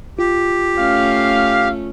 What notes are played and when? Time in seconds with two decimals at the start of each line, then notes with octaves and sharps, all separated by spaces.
0.19 F4 G4
0.78 A3 C#4 F5